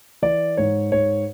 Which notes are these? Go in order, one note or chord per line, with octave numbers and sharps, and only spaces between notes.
E3 D5
G#2 C#5
G#2 C#5